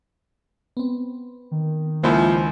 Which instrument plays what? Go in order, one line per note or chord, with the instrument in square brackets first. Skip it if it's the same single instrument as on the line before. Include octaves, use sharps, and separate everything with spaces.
[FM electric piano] B3 C4
[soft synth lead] D#3
[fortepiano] C#2 E4 [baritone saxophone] F3 [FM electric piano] A#3